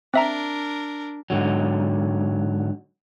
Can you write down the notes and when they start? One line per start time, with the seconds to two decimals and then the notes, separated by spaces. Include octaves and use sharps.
0.14 C4 D4 A#4 E5 A#5
1.30 G#2 D3 F#3